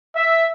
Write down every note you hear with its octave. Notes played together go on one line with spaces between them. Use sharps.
E5